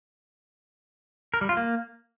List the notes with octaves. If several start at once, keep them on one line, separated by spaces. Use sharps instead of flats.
A#4
G3
F4
A#3